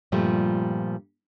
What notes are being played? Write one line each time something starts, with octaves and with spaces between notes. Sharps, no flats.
G2 A#2 F3 G3 A3